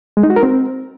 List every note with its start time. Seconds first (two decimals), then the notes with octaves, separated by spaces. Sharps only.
0.17 G#3
0.23 D#4
0.30 F#4
0.36 A#4
0.43 C4